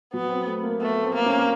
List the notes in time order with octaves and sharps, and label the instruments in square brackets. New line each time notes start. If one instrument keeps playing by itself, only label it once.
[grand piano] F#3 [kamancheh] B3
[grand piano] C4
A3
A#3
[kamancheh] A3 [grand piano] B3
[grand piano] C4
[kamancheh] A#3
[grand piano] C#4